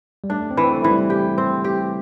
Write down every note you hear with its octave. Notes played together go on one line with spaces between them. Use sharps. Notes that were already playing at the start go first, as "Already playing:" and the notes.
G3
A3 D4
C4
E3
C4
A3
E3
G3
G4
C4
G4